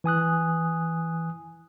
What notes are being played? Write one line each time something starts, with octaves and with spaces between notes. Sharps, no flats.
E3 G#5 D#6 F#6